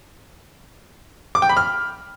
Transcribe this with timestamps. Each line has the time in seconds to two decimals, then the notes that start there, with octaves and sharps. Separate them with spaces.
1.35 D6
1.42 G5
1.49 B5
1.57 F6